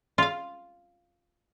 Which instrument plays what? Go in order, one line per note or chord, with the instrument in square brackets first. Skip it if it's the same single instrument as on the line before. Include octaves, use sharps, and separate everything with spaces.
[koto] F4 F5